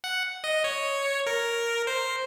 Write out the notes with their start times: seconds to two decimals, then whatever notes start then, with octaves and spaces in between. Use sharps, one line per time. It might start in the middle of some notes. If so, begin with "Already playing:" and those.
0.04 F#5
0.44 D#5
0.64 C#5
1.26 A#4
1.87 C5